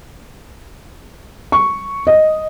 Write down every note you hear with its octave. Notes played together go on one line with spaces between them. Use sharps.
C#6
D#5